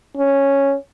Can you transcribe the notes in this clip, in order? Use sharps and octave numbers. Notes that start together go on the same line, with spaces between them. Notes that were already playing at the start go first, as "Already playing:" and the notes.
C#4